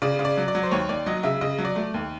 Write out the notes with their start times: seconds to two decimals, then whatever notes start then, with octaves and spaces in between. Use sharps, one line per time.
0.02 C#3 D5
0.19 C#3
0.25 D5
0.37 F#3
0.48 D5
0.55 F#3
0.63 C5
0.71 D#2 C#5
0.89 D#2 D5
1.06 F#3 D#5
1.23 C#3 E5
1.41 C#3 D#5
1.58 F#3
1.65 D5
1.76 A3
1.94 D#2